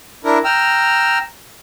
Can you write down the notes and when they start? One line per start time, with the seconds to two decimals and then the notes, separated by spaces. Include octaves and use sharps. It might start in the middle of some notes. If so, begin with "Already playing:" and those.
0.24 D4 E4 A#4
0.45 G5 A#5 E6 F6